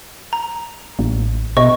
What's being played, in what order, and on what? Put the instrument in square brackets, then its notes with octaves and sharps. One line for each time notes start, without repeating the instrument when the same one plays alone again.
[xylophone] A#5
[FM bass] A1
[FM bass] B2 [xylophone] D#5 C#6